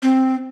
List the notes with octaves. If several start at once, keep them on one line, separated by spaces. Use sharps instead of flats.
C4